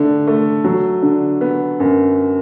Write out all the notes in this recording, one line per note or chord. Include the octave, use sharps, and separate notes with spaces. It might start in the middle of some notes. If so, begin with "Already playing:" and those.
Already playing: D3 A3
A3
F#3
D3
B3
F#2